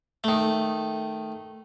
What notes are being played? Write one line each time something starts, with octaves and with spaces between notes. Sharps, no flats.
D#3 A3